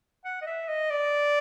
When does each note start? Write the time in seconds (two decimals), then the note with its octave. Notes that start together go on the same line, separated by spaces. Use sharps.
0.25 F#5
0.42 D#5
0.47 E5
0.68 D#5
0.90 D5